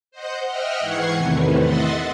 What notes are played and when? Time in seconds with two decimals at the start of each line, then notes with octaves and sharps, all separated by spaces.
0.11 C5 D#5 F#5 G6
0.46 D#5 E5 F#5 G5 F6
0.79 G#2 E3 F#5 C#6 G#6 C7
1.14 E2 A2 C3 D#3 E3
1.58 D#5 E5 F#5 C6 A6